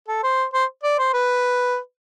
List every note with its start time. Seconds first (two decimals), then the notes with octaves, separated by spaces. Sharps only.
0.08 A4
0.23 C5
0.54 C5
0.84 D5
0.99 C5
1.14 B4